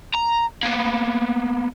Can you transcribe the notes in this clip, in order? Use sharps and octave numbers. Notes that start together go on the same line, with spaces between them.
A#5
A#3 B3